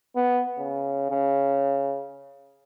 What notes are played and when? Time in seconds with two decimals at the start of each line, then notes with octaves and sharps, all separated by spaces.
0.16 B3
0.58 C#3
1.11 C#3